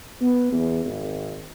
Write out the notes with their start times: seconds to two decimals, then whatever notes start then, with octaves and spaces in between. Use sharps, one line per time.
0.21 B3
0.52 E2
0.85 G#1